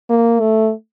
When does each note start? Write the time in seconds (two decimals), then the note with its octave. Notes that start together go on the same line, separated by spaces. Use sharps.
0.10 A#3
0.40 A3